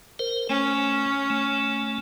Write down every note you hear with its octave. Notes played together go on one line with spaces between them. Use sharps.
A#4 C5
A3 C#4
A3